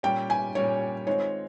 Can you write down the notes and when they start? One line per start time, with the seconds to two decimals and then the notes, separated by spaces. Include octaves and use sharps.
0.03 A#2 G3 C#4 G5
0.30 G#5
0.55 A#2 G3 C#4 C#5
1.07 D#3 G#3 C4 F4 C#5